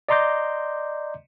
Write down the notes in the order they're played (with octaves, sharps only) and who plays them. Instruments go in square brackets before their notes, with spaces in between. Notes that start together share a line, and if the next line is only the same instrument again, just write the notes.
[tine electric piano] D5 D#5 A#5 C6 D6 G6